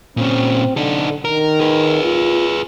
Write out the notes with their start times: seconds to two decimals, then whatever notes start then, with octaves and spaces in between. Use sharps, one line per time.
0.17 A#2 C4 C#4
0.77 D3 D#4 A4
1.25 D#3 A#4
1.60 G#4 B4
2.03 F4